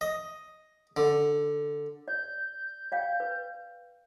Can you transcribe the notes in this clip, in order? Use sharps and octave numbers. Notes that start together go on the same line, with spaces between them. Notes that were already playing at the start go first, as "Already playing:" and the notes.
D#5
D3
D5 G6
D5 F5 G5
B4